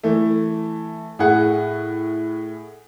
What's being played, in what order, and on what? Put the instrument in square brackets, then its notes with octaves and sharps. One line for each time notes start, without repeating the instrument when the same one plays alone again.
[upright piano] E3 A3
A2 G#4 F#5